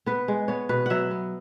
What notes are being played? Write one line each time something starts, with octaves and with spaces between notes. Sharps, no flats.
B3 B4
G#3
B3 C#5
B2 B4
F#3 E5 F#5
B3